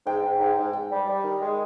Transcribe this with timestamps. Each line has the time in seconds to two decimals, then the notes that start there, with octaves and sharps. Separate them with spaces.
0.06 G#2 G5
0.23 G#2
0.40 G#2
0.58 G#2
0.73 G#2 G5
0.90 G3
1.08 G3
1.24 D#3
1.41 G#3